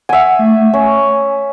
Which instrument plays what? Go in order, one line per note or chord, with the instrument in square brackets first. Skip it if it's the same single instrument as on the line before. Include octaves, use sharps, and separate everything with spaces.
[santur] E5 G#5 [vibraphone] F#5
[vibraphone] A3
[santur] C#4 [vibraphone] G#5